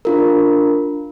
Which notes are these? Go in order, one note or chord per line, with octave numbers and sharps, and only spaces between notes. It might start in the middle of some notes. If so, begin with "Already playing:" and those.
D4 F4 A#4